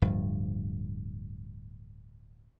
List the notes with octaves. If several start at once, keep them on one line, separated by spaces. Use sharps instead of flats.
D1 G2 F3